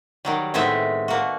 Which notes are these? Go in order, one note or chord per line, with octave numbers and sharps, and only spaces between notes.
D#3 F#3 G3
A2 D#3 G#3 B3 C4 E5
B2 A#3 F#4